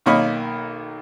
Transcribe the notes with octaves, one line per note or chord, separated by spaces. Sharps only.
B1 D#3 A#3 C#5 D#5 B5